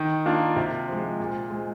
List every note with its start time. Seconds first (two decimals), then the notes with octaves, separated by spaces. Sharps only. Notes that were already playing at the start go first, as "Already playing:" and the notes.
Already playing: D#3
0.26 A#3 D4 F4
0.56 C3
0.88 F3 G#3
1.20 A#2
1.50 G#3 C4